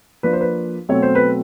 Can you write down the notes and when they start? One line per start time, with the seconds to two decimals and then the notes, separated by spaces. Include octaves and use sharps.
0.23 F3 A#3 D4 B4
0.33 C5
0.41 B4
0.89 B2 F#3 A3 C4 C#5
1.03 C5
1.15 B4